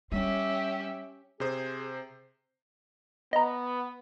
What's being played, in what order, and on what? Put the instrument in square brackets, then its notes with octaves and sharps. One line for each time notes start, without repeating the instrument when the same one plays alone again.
[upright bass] G3 [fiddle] C#4 G4 [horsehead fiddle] E5
[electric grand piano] C3 C5 [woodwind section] G#4
[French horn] B3 [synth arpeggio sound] D#5 A#5